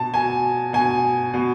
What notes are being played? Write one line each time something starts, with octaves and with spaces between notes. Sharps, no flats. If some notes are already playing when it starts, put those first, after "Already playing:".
Already playing: B2 A5
B2 G#5
B2 G#5
B2